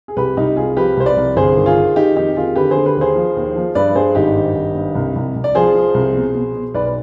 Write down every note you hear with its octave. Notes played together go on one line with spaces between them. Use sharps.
G#4
C2 G4 B4
C2 D#4 G4
C2 F4 G#4
F3 G4 B4
C2 C5
B4 D5
C2
G1 G#4 C5
D#3
F4 G#4
D#3
D#3 D#4 G4
F2 D#4 G4
D#3 F4 G#4
D3 G4 B4
D3 G#4 C5
G4 B4
D#2 G#4 C5
F3
D#2
F3
G2 B4 D5
G2 G#4 C5
G#1 D#4 G4
G2
G#1
G2
C2
C2
C2
D5
F3 G#4 C5
F3
C2
B2
B2
B2
B1 B4 D5
B4